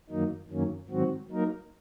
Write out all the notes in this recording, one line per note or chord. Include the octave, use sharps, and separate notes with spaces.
F#2 D#3 F#3 A#3 D#4
F#2 D#3 F#3 A#3 C#4
G#2 D#3 F#3 C4 F#4
F#3 A#3 D#4 A#4